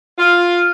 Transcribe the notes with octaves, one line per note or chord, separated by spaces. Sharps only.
F4